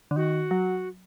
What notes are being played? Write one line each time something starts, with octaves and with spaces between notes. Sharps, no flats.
D3
D#3 F#4
F#3